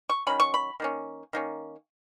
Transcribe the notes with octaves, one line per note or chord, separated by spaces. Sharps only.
C#6
D#3 F#3 C#4 B5
C#6
B5
D#3 A#3 C#4
D#3 A#3 C#4